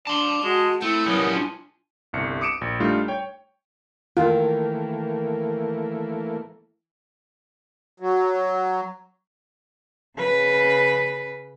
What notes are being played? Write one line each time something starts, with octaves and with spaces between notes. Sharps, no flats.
D4 D5 A5 C6
G#3 F#4
A3 C4 E4
F#3 G3 B3 C#4 G#4 A#4
D4 F4 G#5
G1 C2 C#7
D6 D#6 C#7 D7 E7
A#1
G3 A3 D4 D#4 F4
C#5 G5
D#3 E3 A3 A#3 F4
F#3
C#3 B4